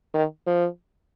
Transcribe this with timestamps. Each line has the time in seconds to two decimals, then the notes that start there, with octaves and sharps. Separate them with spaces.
0.14 D#3
0.47 F3